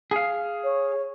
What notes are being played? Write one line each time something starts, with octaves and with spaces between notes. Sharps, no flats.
G#4 F5
C#5